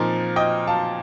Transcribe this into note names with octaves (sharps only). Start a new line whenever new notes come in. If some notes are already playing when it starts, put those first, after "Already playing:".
Already playing: A#2 F3 C4 D#4 A#4
D#5 G5
F5 A5